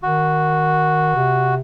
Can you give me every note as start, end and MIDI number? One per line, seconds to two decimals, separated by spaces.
0.03 1.15 51
0.03 1.55 66
1.16 1.60 48